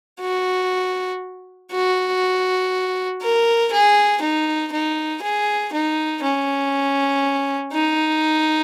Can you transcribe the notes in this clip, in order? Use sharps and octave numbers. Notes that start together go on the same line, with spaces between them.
F#4
F#4
A#4
G#4
D#4
D#4
G#4
D#4
C#4
D#4